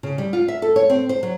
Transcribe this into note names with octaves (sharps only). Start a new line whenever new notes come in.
C#3
G3
F4
E5
A4
C#5
C4
C5
F#3